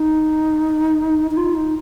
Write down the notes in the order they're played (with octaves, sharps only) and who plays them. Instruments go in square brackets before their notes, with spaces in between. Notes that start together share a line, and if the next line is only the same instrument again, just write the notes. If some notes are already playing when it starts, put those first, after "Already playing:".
Already playing: [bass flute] D#4
D#4
F4
D#4